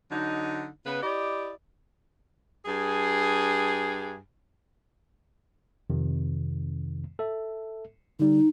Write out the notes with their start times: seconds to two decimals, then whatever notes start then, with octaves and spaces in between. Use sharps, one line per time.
0.11 D3 F#3 D#4
0.84 C#3 B3 B4
1.03 E4 G4 D5 D#5
2.66 G2 G#4
5.90 F2 C3 D#3
7.19 A4 E5
8.20 D3 G3 D#4